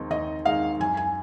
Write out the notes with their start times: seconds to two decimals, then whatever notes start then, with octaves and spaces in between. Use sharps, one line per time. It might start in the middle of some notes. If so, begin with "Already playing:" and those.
Already playing: D#2 D#3 G#3 C4 D#4
0.10 D#2 D#5
0.45 D#3 G#3 C4 D#4 F5
0.80 F#2 G#5
0.97 G#5